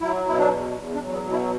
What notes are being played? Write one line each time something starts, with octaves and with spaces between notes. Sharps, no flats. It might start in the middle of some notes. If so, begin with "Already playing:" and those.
F#3 E4
B2 E4
D4
E2
E2
D4
F#3
B3
B2
E4